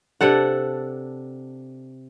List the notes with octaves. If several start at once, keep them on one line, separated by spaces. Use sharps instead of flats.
C3 D4 A4 F#5